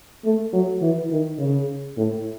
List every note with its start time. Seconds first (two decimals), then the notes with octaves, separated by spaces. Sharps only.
0.25 A3
0.53 F#3
0.82 E3
1.11 D#3
1.39 C#3
1.96 A2